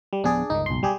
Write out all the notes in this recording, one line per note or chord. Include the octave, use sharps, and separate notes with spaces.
G3
D1 F3 B3 D4 G#4 D5
G1 C#2 D#3 D#4
B1 C6
G3 G4 G#4